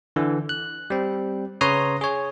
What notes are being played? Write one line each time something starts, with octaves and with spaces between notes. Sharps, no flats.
D3 E3
F#6
G3 C4
C#3 B4 C#5 A#5 C6 D#6
G#4 C#5